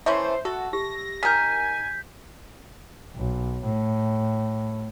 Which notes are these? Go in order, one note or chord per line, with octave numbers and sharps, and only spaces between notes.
E3 A3 C#4 C5 E5 C6
F#4 A4
G4 A#6
D#3 A#4 G#5 G6 B6
B1
A2